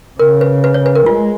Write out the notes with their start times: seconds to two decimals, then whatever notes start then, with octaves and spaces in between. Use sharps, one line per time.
0.19 C#3 A#4
0.41 B4
0.64 B4
0.74 C#5
0.86 B4
0.95 A#4
1.06 G#3 F4